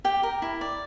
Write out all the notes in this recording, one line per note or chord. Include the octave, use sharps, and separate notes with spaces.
G4 G5
A#4
E4
D5